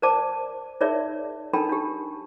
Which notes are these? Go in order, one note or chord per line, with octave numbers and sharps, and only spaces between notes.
A#4 C5 D5 A5 D6
D#4 G#4 A#4 C#5 D5 E5
D4 D#4 A4 A#4 G5 B5
D4 D#4 G4